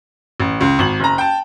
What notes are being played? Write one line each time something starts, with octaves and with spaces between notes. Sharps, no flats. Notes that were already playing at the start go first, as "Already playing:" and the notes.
A1
C#2
G#1 F#7
F#1 A#5
G5 A5